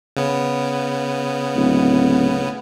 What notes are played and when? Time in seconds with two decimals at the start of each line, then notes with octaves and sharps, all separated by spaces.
0.17 C#3 B3
1.56 D1